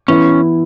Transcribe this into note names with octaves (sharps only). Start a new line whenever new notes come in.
E3 B3 C#4 E4